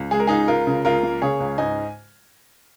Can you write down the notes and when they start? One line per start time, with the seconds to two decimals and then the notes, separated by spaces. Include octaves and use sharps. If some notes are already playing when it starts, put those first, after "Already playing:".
Already playing: C#2
0.11 G#3 G#4
0.20 A#4
0.27 C#2 D#4 G#4
0.48 C#2 F4 A#4
0.67 C#3
0.85 C#2 F4 A#4
1.03 A#3
1.22 C#3 G#4 C#5
1.40 C#2
1.58 G#2 D#5 G#5